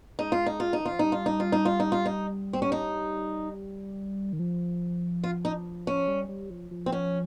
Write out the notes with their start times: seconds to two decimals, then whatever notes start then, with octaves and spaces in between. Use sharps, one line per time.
0.19 G#3 D#4
0.32 F4
0.46 D#4
0.60 F4
0.73 D#4
0.80 D#3
0.86 F4
0.92 F3
0.99 G3 D#4
1.12 F4
1.26 D#4
1.40 F4
1.52 D#4
1.65 F4
1.80 D#4
1.92 F4
2.06 D#4
2.53 C4
2.62 C#4
2.72 D#4
4.33 D#3
4.39 F3
5.24 F4
5.45 D#4
5.87 C#4
6.08 G3
6.29 G3
6.50 F3
6.71 F3
6.86 C4
6.92 C#4